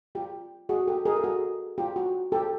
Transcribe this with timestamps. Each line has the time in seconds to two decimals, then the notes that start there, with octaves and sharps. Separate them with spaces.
0.15 F4 G4
0.69 F#4 G#4
0.88 G4 A4
1.06 G#4 A#4
1.16 A4
1.24 F#4 G#4
1.78 F4 G4
1.96 F#4
2.32 G4 A4